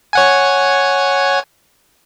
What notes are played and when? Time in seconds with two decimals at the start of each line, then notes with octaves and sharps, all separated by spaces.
0.13 C#5 F#5 G#5